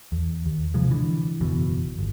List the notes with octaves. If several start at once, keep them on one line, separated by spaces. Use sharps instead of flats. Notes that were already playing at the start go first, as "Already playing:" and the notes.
E2
D#2
C3 F3 G#3
D3 E3
F#1 E2 B2
G1